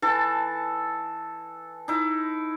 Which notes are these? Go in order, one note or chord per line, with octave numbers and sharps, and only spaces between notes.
E3 A4 A5
D#4 E4